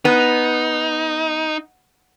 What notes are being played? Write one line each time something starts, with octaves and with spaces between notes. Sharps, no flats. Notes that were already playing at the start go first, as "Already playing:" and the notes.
B3 D#4